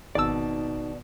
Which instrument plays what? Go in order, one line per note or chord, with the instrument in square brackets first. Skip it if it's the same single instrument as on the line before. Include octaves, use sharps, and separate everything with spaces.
[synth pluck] G#1 E6 [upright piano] B2 [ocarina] D#4 [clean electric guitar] D5 A5